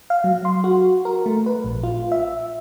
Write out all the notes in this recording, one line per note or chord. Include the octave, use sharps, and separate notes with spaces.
F5
F#3
C6
F#4
A#4
A3
B4
A#1
F4
E5